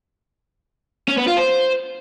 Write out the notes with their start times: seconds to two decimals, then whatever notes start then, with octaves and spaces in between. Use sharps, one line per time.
1.08 C#4
1.17 B3
1.27 F4
1.37 C5